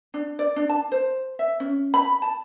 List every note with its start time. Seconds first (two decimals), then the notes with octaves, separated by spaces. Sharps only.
0.14 D4
0.39 D5
0.56 D4
0.69 A5
0.92 C5
1.39 E5
1.60 C#4
1.94 B5
2.22 A5